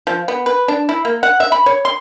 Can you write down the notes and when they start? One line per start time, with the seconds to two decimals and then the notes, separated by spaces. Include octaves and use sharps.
0.07 F3
0.28 B3
0.46 B4
0.68 D4
0.89 E4
1.05 A#3
1.23 F#5
1.40 E5
1.52 B5
1.66 C#5
1.85 C6